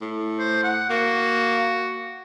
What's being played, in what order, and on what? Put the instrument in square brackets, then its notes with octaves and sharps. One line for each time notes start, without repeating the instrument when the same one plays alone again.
[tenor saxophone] A2
[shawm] C5
F#5
[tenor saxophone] A#3 [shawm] F#4